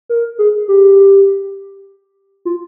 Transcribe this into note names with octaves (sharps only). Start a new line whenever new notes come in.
A#4
G#4
G4
F4